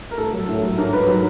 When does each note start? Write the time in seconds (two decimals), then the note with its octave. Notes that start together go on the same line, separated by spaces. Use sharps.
0.11 A#4
0.17 A2 A4
0.33 F#3
0.48 A2
0.63 F#3
0.77 G#2 A#4
0.93 G#2 B4
1.07 F#3